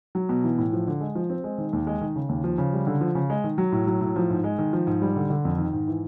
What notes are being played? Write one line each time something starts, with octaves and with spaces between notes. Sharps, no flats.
F#3
B2
E3
A2
F3
D3
G#3
F3
C4
G#3
D#3
D#2
G#3
D#3
C#3
D#2
F3
C#3
G3
D3
F3
C#3
G#3
D#3
F#3
A2
F#3
A2
F3
G#2
G#3
D#3
F3
G#2
G3
D3
D3
F2
D#3
G#2
E3